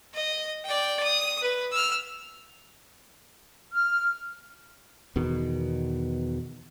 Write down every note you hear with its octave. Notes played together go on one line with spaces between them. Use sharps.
D#5
D5 G5
D#6
B4
E6 F6
F6
E2 B2 D#3